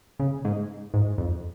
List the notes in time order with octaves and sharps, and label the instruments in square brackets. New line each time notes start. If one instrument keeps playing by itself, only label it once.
[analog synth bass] C#3
G#2
G#2
F2